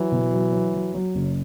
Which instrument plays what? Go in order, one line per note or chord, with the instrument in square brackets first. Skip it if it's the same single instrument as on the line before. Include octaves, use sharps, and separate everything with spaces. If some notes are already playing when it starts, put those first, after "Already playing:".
Already playing: [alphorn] E3 [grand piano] F#3
[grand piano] B2
F#3
F#3
F#3
F#3
F#1